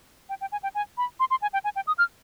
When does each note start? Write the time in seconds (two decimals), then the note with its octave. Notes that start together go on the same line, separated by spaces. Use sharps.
0.29 G5
0.41 G5
0.52 G#5
0.63 G5
0.75 G#5
0.98 B5
1.20 C6
1.31 C6
1.42 G#5
1.53 G5
1.64 G#5
1.76 G5
1.87 D#6
1.98 F6